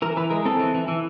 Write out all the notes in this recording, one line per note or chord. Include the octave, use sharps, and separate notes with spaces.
E3 A#4
E3 B4
G#3 A#4
C4 A4
E3
E3
E3